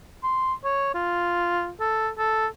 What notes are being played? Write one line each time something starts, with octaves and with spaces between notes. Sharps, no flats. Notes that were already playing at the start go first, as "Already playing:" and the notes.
C6
C#5
F4
A4
A4